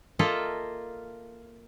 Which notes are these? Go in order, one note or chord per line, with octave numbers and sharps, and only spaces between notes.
A#3 F4 A4 D#5 E5